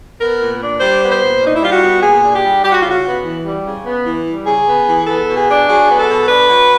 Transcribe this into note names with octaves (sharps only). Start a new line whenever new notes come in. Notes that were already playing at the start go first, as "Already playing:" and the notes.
B3 A#4
A#2
D4
G3 C5
B3
C5
A#2
D4
D#4
E4
G3 F4
F#4
B3
A#2 G#4
D4
G4
G3
G3 G4
F#4
C#3 F4
F#4
B3
E3
G3
C#3
B3
E3
G3
C#3 G#4
B3
E3
B3 A4
B2
G#4
D4
F#3 G#4
B3
A4
B2
D4 B4
F#3